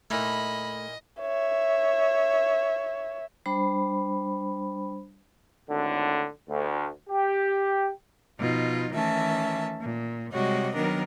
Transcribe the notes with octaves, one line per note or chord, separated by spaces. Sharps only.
A#2 A3 D#4 E4 D#5 B5
C#5 E5
G3 D4 C5 B5
G#1 A2 D3
D2
G4
B2 F3 D#4 F4
D#3 E3 A3 C#4 E5 A5
A#2
C3 G3 G#3 F#4 C#5 D#5
D#3 F#3 B3 D4 A#4